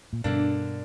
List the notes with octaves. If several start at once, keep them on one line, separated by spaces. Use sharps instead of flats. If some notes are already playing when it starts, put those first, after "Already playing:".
A#2
G2 B2 D3 A#3 D4